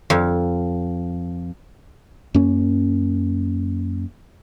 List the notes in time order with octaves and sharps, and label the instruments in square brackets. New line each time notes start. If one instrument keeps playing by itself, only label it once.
[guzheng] F2
[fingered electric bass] F#2 A#3 C#4